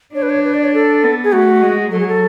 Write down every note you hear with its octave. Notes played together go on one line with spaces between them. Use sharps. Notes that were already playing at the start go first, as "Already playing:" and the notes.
D4 C#5
B4
C#5
B4
D5
C#5
A4
B3
G#4
A3 F#4
G#3
F#3 A4
G#4
A4